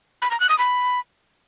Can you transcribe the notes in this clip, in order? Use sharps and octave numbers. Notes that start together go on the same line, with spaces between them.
B5
A#5
F#6
D#6
B5